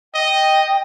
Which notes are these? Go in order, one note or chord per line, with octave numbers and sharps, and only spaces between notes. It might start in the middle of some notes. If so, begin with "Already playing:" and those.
D#5 G5